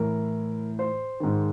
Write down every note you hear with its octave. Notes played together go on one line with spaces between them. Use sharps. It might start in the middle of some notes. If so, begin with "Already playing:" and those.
Already playing: A2 E3 A#4
C5
G#2 D#3